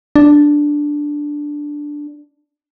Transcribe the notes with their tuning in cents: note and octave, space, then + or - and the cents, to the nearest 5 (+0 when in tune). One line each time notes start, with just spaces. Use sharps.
D4 +0